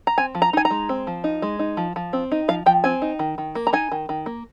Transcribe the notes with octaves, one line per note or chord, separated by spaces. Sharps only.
A#5
C4 G#5
F3
A#5
D#4 G#5
A#5
G#3
C4
F3
D#4
G#3
D#4
F3
F3
C4
D#4
F3 F5
F3 G5
C4 G#5
D#4
D#3
D#3
A#3
A#5
D#4 G#5
D#3
D#3
A#3